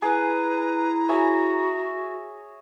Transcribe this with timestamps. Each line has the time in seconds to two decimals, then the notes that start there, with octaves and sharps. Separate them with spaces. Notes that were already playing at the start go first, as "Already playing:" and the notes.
0.02 E4 G#4 B4 A#5
1.09 F#4 G#4 C#5 E5